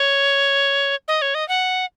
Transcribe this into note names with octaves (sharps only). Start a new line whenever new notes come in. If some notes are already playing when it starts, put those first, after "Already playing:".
Already playing: C#5
D#5
C#5
D#5
F#5